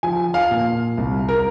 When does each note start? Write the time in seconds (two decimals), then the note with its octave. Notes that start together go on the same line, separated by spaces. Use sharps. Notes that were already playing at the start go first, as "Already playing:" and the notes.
0.03 F3 G#5
0.34 F5
0.51 A#2
0.97 C2
1.29 A#4